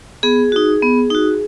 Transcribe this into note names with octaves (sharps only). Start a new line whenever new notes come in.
B3 G#4
D#4 F#4
B3
D#4 F#4